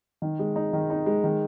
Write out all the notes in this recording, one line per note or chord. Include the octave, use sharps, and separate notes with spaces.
D#3
G#3
D#4
D#3
D#4
G#3
D#3